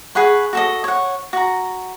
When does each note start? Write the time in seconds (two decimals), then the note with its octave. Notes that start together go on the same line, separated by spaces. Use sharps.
0.15 G#4 B4 F#5 C#6
0.53 F#4 A4 D#5
0.84 C#5 F#5
1.33 F#4 A#5